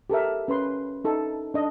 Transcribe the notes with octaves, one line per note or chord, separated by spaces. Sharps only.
G4 A4 A#4 E5
C#4 B4 C6
D#4 A4
D4 D#5